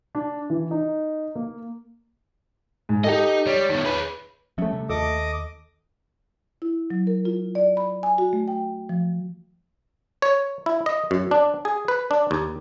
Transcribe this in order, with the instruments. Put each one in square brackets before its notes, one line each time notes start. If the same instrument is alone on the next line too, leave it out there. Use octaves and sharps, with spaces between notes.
[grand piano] D4
E3
D#4
A#3
G#2
[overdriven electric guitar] D#4 D#5 [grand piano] G4 A4
[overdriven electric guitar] G3 [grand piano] C#5
[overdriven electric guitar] D#3 B3
G#4 B4
[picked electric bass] F3 G3 C#4 [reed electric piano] A3 E5
[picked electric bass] C3
[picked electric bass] D#2 [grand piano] A4 [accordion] D#5 D6 D#6
[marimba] E4
F#3
A#4
F4
D5
B5
G#5
F#4
A3
G5
F3
[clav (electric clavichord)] C#5
E4
D#5
F#2
D4
G#4
B4
D4
D#2